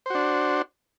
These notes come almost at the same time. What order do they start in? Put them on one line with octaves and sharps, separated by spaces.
C5 F#4 D4